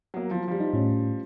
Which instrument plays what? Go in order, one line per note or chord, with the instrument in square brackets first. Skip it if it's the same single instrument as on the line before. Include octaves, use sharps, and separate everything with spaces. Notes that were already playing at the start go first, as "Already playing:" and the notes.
[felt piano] F#3 A#3
F3
F3 G3
[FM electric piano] D#4
A2 C#4